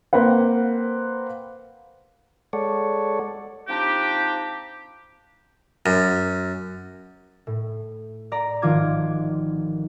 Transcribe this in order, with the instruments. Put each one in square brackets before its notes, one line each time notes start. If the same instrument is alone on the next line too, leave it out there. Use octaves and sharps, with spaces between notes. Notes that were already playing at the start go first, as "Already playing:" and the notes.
[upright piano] A#3 C4 B4 F#5
[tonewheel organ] G#3 A4 C#5 D5 F#5
[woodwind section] F3 C4 D4 D#4 G4
[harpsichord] F#2
[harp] A2
D5 A#5
G#1 D#3 F3 F4 D6 G#6